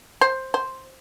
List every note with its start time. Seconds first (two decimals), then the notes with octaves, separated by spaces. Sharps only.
0.21 C5
0.54 C5